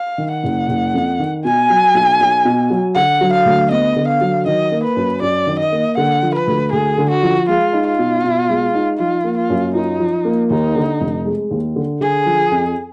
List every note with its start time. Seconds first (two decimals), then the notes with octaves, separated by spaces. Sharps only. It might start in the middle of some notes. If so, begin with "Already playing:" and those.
Already playing: F5
0.18 D#3
0.31 F#5
0.44 F#1
0.69 F#1
0.94 F2
1.19 D#3
1.44 B2 G#5
1.70 F#3
1.94 B1
2.20 B1
2.45 B2
2.70 F#3
2.95 D3 F#5
3.21 F#3
3.33 F5
3.46 D2
3.70 B3 D#5
3.96 D3
4.08 F5
4.21 F#3
4.46 D#3 D#5
4.71 A#3
4.84 B4
4.97 F#2
5.22 F#2 D5
5.47 D#3
5.59 D#5
5.72 A#3
5.97 D3 F#5
6.22 F3
6.35 B4
6.47 D2
6.72 D2 G#4
6.98 D3
7.10 F#4
7.23 F3
7.49 G#3 F4
7.73 D#4
7.86 F4
7.99 B2
8.24 B2
8.49 G#3
8.74 D#4
8.99 F3 F4
9.24 A#3
9.37 F4
9.50 F#2
9.75 D#4 F4
10.00 F3
10.25 A#3
10.50 D#2 D#4
10.75 D3
11.01 F1
11.26 G#3
11.51 D#2
11.76 D3
12.01 D3 G#4
12.26 F3
12.51 F2